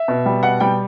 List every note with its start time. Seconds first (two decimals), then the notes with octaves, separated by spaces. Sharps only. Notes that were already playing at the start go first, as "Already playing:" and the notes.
Already playing: E5
0.08 B2
0.26 G3
0.43 B2 F#5
0.60 G3 G5